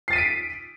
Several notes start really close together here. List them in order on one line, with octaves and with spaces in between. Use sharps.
C7 A6 D#7 B6 D7